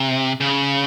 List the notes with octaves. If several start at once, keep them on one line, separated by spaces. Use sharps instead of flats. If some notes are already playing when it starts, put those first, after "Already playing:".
Already playing: C3
C#3